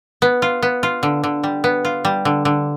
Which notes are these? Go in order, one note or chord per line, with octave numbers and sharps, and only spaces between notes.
B3
F4
B3
F4
D3
D3
G3
B3
F4
G3
D3
D3